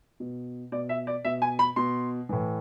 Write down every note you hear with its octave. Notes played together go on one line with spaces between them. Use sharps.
B2
B2 D5
E5
D5
B2 E5
G#5
B5
B2 C6
A2 E3